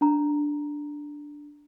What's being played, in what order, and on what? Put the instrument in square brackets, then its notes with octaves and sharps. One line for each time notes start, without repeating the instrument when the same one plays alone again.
[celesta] D4 A#5